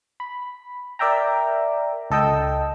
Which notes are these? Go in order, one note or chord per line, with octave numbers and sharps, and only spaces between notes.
B5
A#4 D5 E5 G5 A#5
C#2 A4 D#5 G5 E6